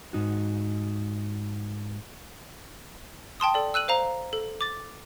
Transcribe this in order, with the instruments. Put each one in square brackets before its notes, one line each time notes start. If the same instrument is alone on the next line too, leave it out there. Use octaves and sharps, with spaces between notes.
[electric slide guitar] G#2 D#4 F#4
[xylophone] G5 A5 C6 D#6
A4 D5
E6 F#6 D#7 F#7
C5 F5 A#5
A4
D6 A6